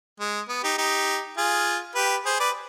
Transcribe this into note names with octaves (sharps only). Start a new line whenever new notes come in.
G#3
B3
D#4 G4
D#4 G4
F4 G#4
G4 B4
G#4 C5
B4 D5